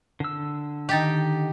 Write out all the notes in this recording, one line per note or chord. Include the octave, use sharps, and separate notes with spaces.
D3 E6
D#3 D#4 G4 G5 A6